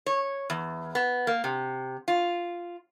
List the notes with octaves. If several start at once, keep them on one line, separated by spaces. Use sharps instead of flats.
C#5
E2
B3
A#3
C3
F4